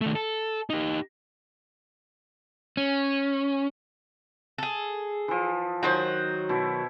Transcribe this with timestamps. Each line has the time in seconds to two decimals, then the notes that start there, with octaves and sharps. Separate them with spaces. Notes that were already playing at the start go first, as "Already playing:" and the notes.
0.01 D#3 A3
0.15 A4
0.70 D#4 G4
2.77 C#4
4.58 G#4 A4
5.28 E3 F3
5.83 D#3 F#3 D#4 F#4 C5
6.49 B2 E4